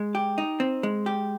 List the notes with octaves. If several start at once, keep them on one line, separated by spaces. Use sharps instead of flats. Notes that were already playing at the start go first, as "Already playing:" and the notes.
Already playing: G#3
G4
D#4
C4
G#3
G4